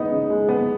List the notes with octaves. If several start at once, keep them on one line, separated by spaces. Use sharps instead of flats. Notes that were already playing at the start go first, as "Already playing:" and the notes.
Already playing: G#3 B3 D#4
C#3
G#3
B3